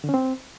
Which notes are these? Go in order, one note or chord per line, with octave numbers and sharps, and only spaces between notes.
D3
C#4
C4